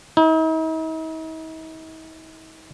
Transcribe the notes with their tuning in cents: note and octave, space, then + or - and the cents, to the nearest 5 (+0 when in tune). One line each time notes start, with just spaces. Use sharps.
D#4 +45